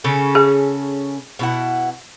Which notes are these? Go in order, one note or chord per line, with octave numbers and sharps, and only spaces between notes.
C#3 C#4 A4
G#4
B2 E4 F#5